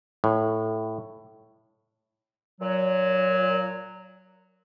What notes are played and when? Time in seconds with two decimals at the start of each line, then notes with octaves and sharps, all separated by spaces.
0.24 A2
2.61 A#2 F#3